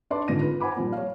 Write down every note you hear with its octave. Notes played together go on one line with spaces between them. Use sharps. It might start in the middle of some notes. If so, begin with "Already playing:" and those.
D4 B4 D5 C6
G#1 G#2 D3 F4 A#6 D#7
F4 B4
C5 F#5 G#5 B5 D6
A#2 F3 G3
C#5 F5